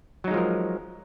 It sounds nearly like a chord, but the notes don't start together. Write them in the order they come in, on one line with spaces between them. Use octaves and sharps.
F#3 D#4 G#3 F3 A#4